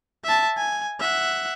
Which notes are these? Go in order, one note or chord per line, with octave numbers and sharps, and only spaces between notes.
E5 A5
G#5
E5 F#5